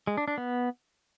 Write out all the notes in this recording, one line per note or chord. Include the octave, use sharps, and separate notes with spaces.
G#3
D4
D4
B3